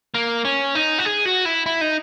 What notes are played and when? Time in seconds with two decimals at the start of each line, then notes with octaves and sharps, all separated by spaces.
0.14 A#3
0.45 C#4
0.75 D#4
0.99 F#4
1.05 G#4
1.25 F#4
1.45 E4
1.66 E4
1.81 D#4